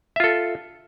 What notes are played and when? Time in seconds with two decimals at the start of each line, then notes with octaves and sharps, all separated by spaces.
0.16 E5
0.20 F4
0.24 A4